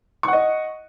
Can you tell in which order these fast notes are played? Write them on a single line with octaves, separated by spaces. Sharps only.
C#6 F#5 D#5